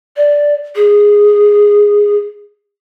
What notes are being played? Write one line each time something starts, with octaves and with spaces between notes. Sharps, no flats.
D5
G#4